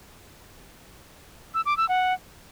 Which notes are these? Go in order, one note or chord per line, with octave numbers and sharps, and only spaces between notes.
E6
D6
E6
F#5